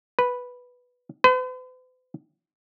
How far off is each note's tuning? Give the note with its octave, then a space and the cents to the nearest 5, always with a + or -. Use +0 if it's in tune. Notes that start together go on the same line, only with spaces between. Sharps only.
B4 -5
B4 +45